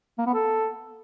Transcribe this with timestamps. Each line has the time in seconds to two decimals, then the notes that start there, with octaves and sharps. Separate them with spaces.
0.18 A#3
0.26 B3
0.34 A4